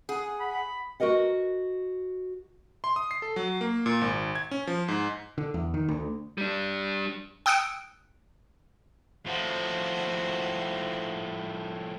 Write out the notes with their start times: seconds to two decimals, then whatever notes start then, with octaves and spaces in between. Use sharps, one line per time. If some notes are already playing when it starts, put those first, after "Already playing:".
0.09 G#4 F#5
0.40 B5
1.00 F#4 G4 A#4 D#5 F#5
2.84 C6
2.96 D#6
3.11 C7
3.22 A4
3.36 F#3
3.61 A#3
3.86 A#2
4.01 G#1
4.35 G#6
4.51 C#4
4.67 F3
4.88 G#2
5.38 D3
5.54 E2
5.74 D#3
5.89 D2
6.38 G3 D4
7.46 G5 D#6 E6 F#6 C#7 D7
9.26 A2 F3 F#4 C5